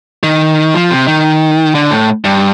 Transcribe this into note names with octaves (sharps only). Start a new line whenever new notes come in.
D#3
F3
C3
D#3
D3
A2
G2